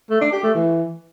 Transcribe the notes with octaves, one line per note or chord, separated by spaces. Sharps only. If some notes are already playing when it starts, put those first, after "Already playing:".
A3
D4
G4
A3
E3